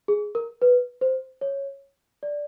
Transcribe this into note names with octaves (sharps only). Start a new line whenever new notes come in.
G#4
A#4
B4
C5
C#5
D5